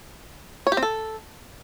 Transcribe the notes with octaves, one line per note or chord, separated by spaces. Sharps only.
C#5
G4
C4
A4